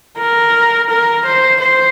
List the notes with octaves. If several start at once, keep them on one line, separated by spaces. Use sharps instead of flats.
A#4
A#4
C5
C5